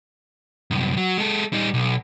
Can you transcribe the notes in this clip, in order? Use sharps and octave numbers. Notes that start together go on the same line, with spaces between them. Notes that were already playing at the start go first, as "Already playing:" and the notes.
C2 F#2
F#3
G#3 A4
G3 D#4
B1